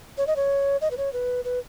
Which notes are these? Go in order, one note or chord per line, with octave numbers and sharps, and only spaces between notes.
C#5
D#5
C#5
D#5
B4
C#5
B4
B4